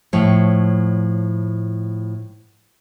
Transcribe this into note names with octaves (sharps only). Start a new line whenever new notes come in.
A2 F3 C#5